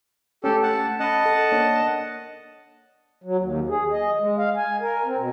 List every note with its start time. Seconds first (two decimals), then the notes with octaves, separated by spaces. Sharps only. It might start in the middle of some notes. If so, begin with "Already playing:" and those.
0.44 A3 C#4 G4 A4
0.63 F#5 A5
1.00 C#4 D#5 F#5 A5 B5
1.26 A4
1.52 A#3 D4 C#5
3.24 F#3
3.38 D#2
3.69 G#4
3.92 D#5
4.20 G#3
4.38 F5
4.57 G#5
4.81 A#4
5.05 C4
5.17 B2